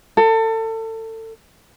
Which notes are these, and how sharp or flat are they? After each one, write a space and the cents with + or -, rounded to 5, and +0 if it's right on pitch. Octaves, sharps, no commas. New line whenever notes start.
A4 +30